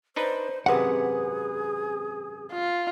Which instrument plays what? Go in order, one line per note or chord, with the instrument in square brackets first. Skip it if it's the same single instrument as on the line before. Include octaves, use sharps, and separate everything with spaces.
[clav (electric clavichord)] D4 D#4 B4 [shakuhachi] C5
[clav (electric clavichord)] G#1 F#2 C3 [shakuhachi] G#4 [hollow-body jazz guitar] B4 F#5
[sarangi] F4